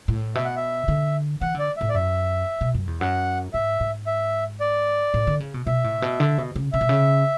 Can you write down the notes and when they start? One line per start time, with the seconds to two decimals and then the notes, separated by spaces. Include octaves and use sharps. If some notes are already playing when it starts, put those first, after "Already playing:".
0.08 A2
0.35 B2 E5
0.45 F#5
0.56 E5
0.88 D3
1.41 E3 F#5
1.54 D3 D5
1.77 A2 E5
1.89 D5
1.94 F#2 E5
2.61 B2
2.74 F#2
2.87 E2
3.01 F#2 F#5
3.53 G#2 E5
3.80 G#2
4.07 E5
4.60 D5
5.14 A2
5.27 D3
5.40 C#3
5.54 B2
5.67 B2 E5
5.84 A2
6.02 B2
6.20 D3
6.38 B2
6.56 C#3
6.73 C#3 E5
6.81 B2
6.89 C#3